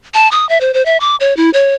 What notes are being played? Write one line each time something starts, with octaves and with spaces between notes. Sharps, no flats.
A5
D#6
E5
C5
C5
E5
D6
C#5
E4
C#5